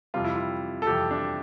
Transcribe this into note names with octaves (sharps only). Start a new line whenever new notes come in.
F2 C3 G3 F4
E4
F4
A4
F2 C3 G3 G4
D4